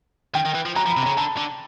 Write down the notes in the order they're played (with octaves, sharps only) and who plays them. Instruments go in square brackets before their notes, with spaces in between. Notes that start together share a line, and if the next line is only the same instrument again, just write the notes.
[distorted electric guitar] D#3 [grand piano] G5
[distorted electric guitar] D#3
E3
F3
[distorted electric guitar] F#3 [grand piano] A#5
[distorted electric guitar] F3
[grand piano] B5
[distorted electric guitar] C3
[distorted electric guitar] C#3 [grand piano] A#5
[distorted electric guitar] D3 [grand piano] A5
[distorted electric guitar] D3